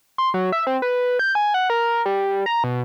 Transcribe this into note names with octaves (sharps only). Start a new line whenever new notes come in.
C6
F#3
E5
C4
B4
G6
G#5
F#5
A#4
G3
A#5
B2